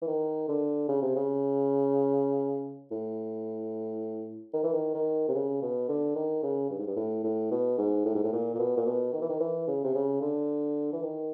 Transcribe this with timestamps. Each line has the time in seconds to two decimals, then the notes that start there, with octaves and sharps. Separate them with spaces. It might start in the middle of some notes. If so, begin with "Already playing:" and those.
0.02 E3
0.07 D#3
0.48 D3
0.88 C#3
1.02 C3
1.16 C#3
2.91 A2
4.53 D#3
4.63 E3
4.73 D#3
4.94 D#3
5.28 C3
5.35 C#3
5.62 B2
5.88 D3
6.15 D#3
6.43 C#3
6.70 G2
6.78 G#2
6.87 G2
6.96 A2
7.24 A2
7.51 B2
7.78 G#2
8.05 A2
8.15 G#2
8.23 A2
8.32 A#2
8.54 A#2
8.59 B2
8.77 A#2
8.86 B2
9.13 D#3
9.21 E3
9.29 D#3
9.40 E3
9.67 C#3
9.84 C3
9.94 C#3
10.21 D3
10.92 E3
11.02 D#3